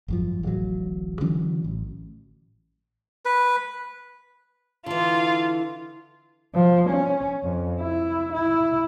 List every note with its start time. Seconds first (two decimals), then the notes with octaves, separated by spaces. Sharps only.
0.08 G#1 F#2 F3
0.43 D1 A1 F#3
1.21 D3 E3 F#3 C#4
1.64 A1
3.25 B4
4.86 D3 E3 F4
6.54 F3
6.90 C#4
7.43 F2
7.81 E4
8.33 E4